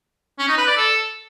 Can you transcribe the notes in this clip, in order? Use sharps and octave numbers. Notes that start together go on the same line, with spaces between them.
C#4
D#4
B4
D5
A4